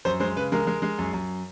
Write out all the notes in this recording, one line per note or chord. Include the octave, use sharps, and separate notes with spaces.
F#2 C5
G#3 C5
C#3 B4
G#3 A#4
G#3
G#3
F#2
F#2